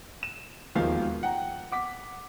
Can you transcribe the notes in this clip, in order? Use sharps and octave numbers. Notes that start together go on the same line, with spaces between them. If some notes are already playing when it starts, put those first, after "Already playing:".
E7
E1 D#2 D#3 F3 G#3 F5
F#5 G5 A#5
F#5 D6 B6